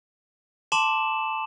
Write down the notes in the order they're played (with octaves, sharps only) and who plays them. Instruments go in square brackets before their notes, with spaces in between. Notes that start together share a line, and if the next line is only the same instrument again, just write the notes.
[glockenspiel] A5 C6 D6 E7 F#7